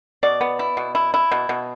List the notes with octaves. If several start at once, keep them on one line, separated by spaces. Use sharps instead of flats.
B2 D5
B3
E4
B2
E4
E4
B2
B2